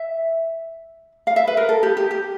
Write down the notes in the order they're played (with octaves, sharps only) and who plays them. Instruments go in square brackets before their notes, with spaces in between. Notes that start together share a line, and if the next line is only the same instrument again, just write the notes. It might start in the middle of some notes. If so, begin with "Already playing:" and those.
Already playing: [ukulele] E5
F5
E5
B4
A#4
A4
G4
G4
G4